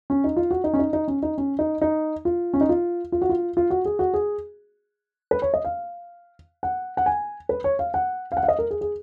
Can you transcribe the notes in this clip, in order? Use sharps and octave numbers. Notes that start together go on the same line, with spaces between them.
C#4
D#4
F4
F#4
D#4
C#4
D#4
D#4
C#4
D#4
C#4
D#4
D#4
F4
C#4
D#4
F4
F4
F#4
F4
F4
F#4
G#4
F#4
G#4
B4
C#5
D#5
F5
F#5
F#5
G#5
B4
C#5
F5
F#5
F5
F#5
F5
D#5
A#4
G#4
G#4